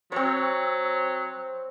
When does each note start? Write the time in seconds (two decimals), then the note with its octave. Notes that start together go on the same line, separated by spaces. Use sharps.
0.12 F#3 C4 C#5